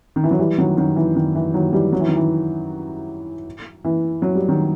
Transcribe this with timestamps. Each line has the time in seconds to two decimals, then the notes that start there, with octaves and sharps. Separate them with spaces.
0.16 D#3
0.24 E3
0.31 F#3
0.39 E3 G3
0.58 D#3 F#3
0.77 D#3 F#3
0.96 E3
1.16 D#3
1.35 E3
1.54 D#3 F#3
1.73 E3 G3
1.92 F#3
2.00 E3
2.08 D#3
2.16 E3
3.85 E3
4.22 F#3
4.35 G3
4.49 D#3 F#3